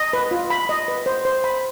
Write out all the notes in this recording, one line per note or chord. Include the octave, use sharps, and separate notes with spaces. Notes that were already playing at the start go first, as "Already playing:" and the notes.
Already playing: D#5
B4
F4
B5
D#5
B4
C5
C5
B5